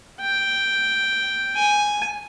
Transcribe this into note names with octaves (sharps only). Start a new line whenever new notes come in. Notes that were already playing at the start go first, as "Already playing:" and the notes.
G5
G#5